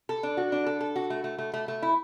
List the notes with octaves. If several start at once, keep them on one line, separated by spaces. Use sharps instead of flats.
A4
D4
F#4
D4
A4
A4
F#4
A3
A3
A3
A3
A3
E4